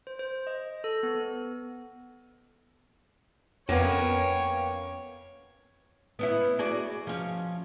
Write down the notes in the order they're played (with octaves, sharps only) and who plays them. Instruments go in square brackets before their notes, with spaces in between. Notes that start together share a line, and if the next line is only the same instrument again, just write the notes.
[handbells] C5
C5
D#5
A4
B3
[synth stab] F2 B3 [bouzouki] A#3 C#4 B4 [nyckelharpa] C#5 [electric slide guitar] F5 G5
[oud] B3 C#4 E4
F#4 G#4 D5
F3 C#4